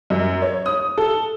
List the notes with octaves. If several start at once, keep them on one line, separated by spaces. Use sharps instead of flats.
F#2
C#5
D#6
A4